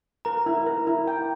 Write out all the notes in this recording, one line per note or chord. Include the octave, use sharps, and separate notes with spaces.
A#4 A#5
E4
A#4
E4
G5